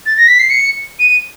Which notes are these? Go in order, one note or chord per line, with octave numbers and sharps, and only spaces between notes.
A6
A#6
B6
C7
C#7
D#7